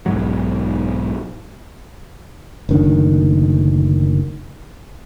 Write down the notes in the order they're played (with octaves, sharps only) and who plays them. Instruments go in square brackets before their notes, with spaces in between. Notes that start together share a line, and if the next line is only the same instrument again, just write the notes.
[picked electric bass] B1 G#2 F#3
[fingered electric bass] F#1 D2 D#3 D4